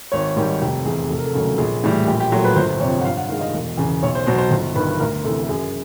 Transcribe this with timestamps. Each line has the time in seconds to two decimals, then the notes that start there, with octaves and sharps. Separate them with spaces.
0.12 G#1 C#5
0.36 G#2 D#3 G3
0.61 F1 G4
0.85 E2 G#4
0.89 C3
1.10 F1 A4
1.18 A#4
1.25 A4
1.34 D#2 C#3 F#3 A3
1.58 A#1 G#4
1.84 A2 E3 G3
2.07 A#1 G4
2.20 G4
2.32 A#2 F#3 A3
2.45 B4
2.56 G1 C5
2.80 F2 C#5
2.84 C3
3.00 F#5
3.05 G2 F5
3.17 F#5
3.29 D#3 G#3 F5
3.41 D#5
3.54 E1
3.77 E2 C#3
4.03 B1 C#5
4.15 C5
4.26 B2 F#3 B3 C5
4.38 C5
4.51 G1
4.75 G2 D#3 B4
4.99 D2 A#4
5.24 C3 A4
5.29 E3
5.44 A4
5.49 F#2 G#4